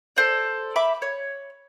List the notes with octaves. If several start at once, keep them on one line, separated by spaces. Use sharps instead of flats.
A4 C5 D5
E5 B5 D6
C#5